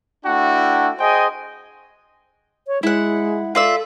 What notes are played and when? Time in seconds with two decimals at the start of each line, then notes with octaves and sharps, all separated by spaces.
0.25 A3 D4 E4 F#4 G5
0.99 G#4 C5 D#5 G5 G#5
2.67 C#5
2.83 G#3 E4 F#5
3.55 F4 A4 D5 E5